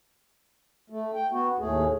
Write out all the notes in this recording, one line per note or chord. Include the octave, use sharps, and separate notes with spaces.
A3
G5
B3 F#4
D#2 A2 A3 G#4